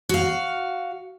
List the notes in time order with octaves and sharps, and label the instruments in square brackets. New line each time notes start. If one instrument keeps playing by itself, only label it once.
[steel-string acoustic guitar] F#4 F5